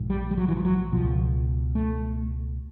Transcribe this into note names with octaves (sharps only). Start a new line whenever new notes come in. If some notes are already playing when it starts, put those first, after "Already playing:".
Already playing: A#1 G#2
G3
G3
F#3
E3
F3
F#3
C#2 B2 F3
A3